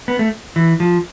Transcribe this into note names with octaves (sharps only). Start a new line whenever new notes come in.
B3
A3
E3
F3